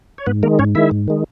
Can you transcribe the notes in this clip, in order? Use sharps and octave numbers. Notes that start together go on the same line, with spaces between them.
C#5
G#2 B3 B4
D#3 G#3 A#3 A#4
G#2 C#4 C#5
D#3 G#3 E4 E5
G#2
D#3 G#3